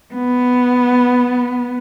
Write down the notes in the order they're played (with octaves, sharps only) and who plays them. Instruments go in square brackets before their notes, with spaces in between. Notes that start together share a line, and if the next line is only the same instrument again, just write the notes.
[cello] B3